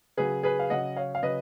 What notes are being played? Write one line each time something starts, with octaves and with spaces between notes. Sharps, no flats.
C#3 F#3 G#4 B4
G#4 B4
F5
C#3 F#3 D#5 F#5
C#5 F5
F5
C#3 F#3 B4 D#5